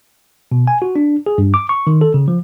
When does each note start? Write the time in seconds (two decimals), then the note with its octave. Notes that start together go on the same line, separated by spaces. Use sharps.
0.52 B2
0.68 G#5
0.82 F#4
0.96 D4
1.26 G#4
1.38 G2
1.54 D6
1.69 C#6
1.87 D#3
2.01 A4
2.14 C#3
2.28 F3